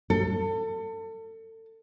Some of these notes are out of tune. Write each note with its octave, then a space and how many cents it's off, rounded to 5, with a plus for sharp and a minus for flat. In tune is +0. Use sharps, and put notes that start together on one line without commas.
A4 +30